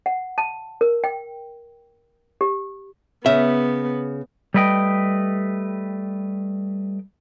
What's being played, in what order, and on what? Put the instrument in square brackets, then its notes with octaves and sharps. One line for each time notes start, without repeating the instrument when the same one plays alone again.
[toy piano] F#5
A5
A#4
G5
G4
[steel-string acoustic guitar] C#3 [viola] B3 [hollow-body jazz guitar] E5
[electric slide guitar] G3 A3 B4 D#5 G5